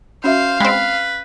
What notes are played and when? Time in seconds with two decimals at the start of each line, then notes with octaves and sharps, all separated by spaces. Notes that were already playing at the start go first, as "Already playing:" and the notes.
0.24 C#4 F#4 C5 E5 F5
0.60 G#3 C4 B4 G5 B5